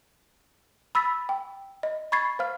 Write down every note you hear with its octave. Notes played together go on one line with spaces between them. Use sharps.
B5 E6 A6 B6
G5
D#5
B5 C#6 G#6 A6 C7
C5 F5 F6